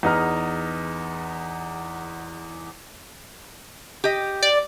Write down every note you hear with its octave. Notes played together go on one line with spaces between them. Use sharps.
E2 B3 D#4 G#4 A#5 F6
G4 D#5
D5